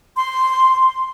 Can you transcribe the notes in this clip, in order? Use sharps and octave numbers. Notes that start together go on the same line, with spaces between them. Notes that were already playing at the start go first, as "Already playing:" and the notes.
C6